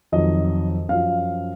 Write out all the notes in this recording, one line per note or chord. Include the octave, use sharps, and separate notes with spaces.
F2 D#3 F#3 D#5
F#2 F3 F5